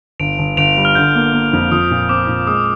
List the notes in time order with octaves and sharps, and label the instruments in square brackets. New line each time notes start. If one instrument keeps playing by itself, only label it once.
[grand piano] G1 [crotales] D7 F7
[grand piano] G1
[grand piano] G1 [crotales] D7 F7
[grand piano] G3
[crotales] F6
[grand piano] D3 [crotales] G6
[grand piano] A#3
A#3
[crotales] F6
[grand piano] F2
[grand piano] F3 [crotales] D#6
[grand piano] A#2
[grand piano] C4 [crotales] D6
[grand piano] A#2
[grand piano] G#3 [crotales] D#6